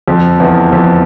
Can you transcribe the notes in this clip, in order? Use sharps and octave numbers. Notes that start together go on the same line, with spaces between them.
F2
E2
F2